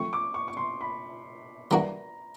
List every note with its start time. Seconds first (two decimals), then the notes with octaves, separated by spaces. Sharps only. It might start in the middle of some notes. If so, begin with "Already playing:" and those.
Already playing: F3 A3 C4 C#6
0.13 D6
0.34 C#6
0.48 C#6
0.57 C6
0.81 B5
1.71 E3 G3 A#3 D4 F#4 A#5